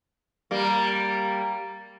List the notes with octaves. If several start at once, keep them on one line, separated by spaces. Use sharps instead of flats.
G3 A#3